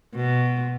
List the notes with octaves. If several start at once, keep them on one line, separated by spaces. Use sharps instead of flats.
B2